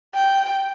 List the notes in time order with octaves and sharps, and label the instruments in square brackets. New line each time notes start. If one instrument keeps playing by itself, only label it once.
[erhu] G5